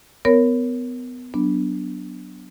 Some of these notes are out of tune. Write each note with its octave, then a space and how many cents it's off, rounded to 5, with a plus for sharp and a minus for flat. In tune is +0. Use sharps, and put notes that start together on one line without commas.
B3 +25 A#4 +0 C#5 +0
F#3 +15 B3 +0 D4 +0